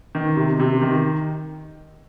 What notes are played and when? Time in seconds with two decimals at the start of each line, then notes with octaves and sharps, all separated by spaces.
0.15 D#3
0.36 C3
0.60 C3
0.81 D#3